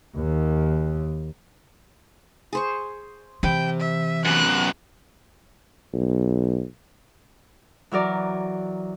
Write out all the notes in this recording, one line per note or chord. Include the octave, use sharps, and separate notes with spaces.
D#2
G#4 C5 C#6
C3 E3 G5 B5
E5
F#2 B2 F#6
B1
E3 F#3 A#4 D5